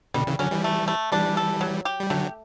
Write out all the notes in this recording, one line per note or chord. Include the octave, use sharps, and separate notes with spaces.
B2 D3 G3
C#3 E3
D3 F#3 C#4
E3 G3
A3
A3
E3 G3 D4
A4
F#3
G4
G3
D3 F#3 A3